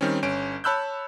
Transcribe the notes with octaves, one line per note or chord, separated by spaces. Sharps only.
D#3 G3 C4 C#4
G1 C#4 D7
C#5 A5 B5 E6 F#6 G6